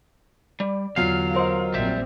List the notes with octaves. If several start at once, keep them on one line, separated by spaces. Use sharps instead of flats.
G3 D5
E2 D3 F#3 F4 F5 C7
A#4 C5 D#5
A#1 G3 C4 E5